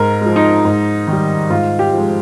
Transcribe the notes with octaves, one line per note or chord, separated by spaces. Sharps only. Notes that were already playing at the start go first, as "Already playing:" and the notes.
Already playing: G#2 A#4
F3 G#3
D#4
G#2
D#3
G3
G#2 F4
G4
F3 G#3